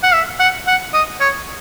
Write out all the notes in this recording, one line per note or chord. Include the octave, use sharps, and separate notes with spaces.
F#5
E5
F#5
F#5
D#5
C#5